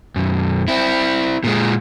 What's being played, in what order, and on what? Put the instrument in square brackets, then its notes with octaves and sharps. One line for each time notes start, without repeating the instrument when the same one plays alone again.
[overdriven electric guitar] B1 F#2
C4 E4
A#2 G#3